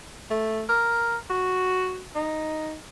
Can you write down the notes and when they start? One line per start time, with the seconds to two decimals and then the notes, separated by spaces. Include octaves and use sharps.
0.31 A3
0.69 A#4
1.30 F#4
2.15 D#4